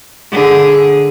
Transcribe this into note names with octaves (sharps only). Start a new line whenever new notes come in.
D3 G#4